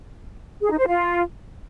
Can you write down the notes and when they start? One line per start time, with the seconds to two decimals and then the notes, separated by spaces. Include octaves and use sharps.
0.62 G#4
0.70 D#4
0.79 C5
0.87 F4